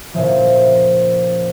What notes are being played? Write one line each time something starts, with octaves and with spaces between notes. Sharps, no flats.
A#2 C#3 F3